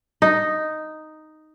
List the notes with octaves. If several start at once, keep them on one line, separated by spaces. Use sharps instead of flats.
D#4